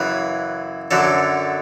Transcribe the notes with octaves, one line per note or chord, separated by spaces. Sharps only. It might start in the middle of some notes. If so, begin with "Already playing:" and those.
Already playing: F#2 C#3 E3 B4
F#2 D3 F#3 A4